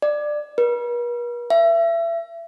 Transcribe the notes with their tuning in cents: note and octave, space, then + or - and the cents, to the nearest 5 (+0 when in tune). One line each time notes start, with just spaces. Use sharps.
D5 +15
B4 -45
E5 +30